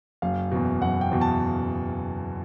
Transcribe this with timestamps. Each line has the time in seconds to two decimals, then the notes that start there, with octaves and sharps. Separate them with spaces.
0.22 F#1 F5
0.52 E2 B2
0.82 F#1 F#5
1.01 G5
1.11 E2 B2
1.21 A5